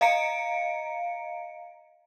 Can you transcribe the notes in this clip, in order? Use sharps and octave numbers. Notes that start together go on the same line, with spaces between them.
D#5 F5 A#5 C#7 D7